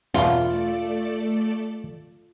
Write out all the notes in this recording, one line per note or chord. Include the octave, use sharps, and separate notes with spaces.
E2 B2 A3 F4 A4 D5